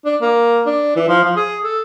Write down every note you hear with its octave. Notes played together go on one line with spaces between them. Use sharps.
D4
A#3
D4
E3
F3
F3
G#4
A4